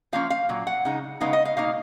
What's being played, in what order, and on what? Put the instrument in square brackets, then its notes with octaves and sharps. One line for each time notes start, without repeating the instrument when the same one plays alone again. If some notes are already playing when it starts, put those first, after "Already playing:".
[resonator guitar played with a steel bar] F3 A#3 C#4 F5
F5
A#2 F#3
F#5
C#3 G#3 D#4
C#3 G#3 B3 D#4 F5
D#5
F5
B2 A#3 D#4 F5